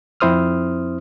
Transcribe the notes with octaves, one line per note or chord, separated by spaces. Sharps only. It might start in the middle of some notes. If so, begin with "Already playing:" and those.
F2 C4 E4 C5 D#6 F6